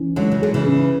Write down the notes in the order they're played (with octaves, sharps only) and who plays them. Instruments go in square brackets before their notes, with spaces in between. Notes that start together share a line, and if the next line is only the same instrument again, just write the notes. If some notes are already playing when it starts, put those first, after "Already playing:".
Already playing: [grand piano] E3 C#4
[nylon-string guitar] D3 F#3 [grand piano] G#3
[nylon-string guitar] C#3
[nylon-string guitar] D3 [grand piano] G#4
[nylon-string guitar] C#3 E3
[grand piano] C#4